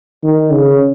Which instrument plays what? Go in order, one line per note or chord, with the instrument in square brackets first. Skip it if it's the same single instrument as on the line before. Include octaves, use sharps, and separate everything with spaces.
[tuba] D#3
C#3